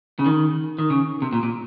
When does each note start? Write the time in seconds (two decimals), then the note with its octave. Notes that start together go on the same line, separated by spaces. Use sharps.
0.19 C#3
0.26 D#3
0.79 D#3
0.90 C#3
1.22 C3
1.33 A#2
1.43 A#2